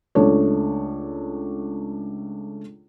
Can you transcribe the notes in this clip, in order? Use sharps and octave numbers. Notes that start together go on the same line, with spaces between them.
C#2 A3 D4 C#5